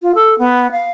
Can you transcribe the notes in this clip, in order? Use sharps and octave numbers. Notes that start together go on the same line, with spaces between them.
F4
A4
B3
F5